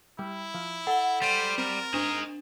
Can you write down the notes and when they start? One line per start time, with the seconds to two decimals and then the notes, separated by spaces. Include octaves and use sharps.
0.19 G3 E4
0.54 F3
0.87 A4 F#5 G7
1.22 G3 C5 A6
1.58 C4 A#4
1.94 D4 D#4 G#4